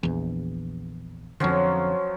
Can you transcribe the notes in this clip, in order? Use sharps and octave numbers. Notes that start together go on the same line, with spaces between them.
A#1 E2
F2 D3 F3 F#3 C#4